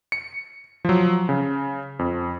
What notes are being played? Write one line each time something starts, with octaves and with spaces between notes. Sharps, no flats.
C#7
F3 F#3
C#3
F2